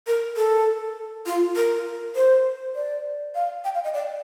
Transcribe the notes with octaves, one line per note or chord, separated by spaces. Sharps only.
A#4
A4
F4
A#4
C5
D5
F5
G5
F5
D#5
D5